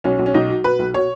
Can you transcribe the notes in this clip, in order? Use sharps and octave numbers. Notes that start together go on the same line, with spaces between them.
B1 C#4
B1
C#4
B1 D#4
F#3
B2 B4
B1
B2 C#5